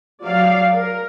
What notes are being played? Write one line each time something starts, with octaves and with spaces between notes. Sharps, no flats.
F#3 D5 F5
A#4